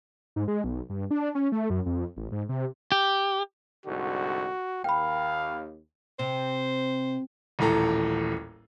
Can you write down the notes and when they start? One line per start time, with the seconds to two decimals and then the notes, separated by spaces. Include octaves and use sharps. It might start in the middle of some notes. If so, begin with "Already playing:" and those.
0.36 G#2
0.48 G#3
0.64 B1
0.90 G2
1.11 D4
1.35 C#4
1.52 A3
1.70 F#2
1.86 F2
2.17 A1
2.32 G#2
2.49 C3
2.92 G4
3.86 C2 G#2 D3 F#4
4.84 D#2 F5 G5 B5
6.19 C3 C5
7.59 D#1 A1 A2 A4 A#5